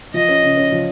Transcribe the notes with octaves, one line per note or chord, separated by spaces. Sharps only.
F3 D#5
C#4
C#3
C#4
F3